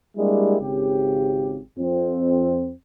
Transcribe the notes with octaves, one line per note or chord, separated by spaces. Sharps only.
G3 G#3 A#3 D4 E4 G4
G#1 C#3 G4
F2 C4